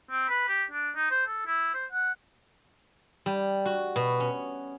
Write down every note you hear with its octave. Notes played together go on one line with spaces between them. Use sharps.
C4
B4
G4
D4
D#4
C5
A4
E4
C5
F#5
G3
F#4
B2
C#4